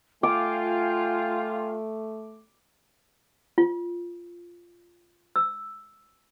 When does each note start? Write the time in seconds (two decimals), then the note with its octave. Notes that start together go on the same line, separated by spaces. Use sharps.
0.23 A3 F4 F5 G5 G#5 D6
3.58 F4
5.36 E6